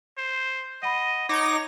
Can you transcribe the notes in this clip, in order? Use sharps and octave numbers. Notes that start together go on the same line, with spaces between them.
C5
D#5 F#5 B5
D#4 C#5 D6 A#6